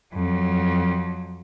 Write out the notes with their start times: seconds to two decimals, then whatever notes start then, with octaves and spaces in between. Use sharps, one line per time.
0.13 F2 F#3